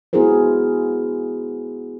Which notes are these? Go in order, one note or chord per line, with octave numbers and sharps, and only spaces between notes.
B3 E4 F#4 G#4 A#4 C5